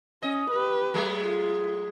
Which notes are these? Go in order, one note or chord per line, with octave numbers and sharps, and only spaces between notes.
C#4 D#5
G4 B4
F#3 G#3 A3
F4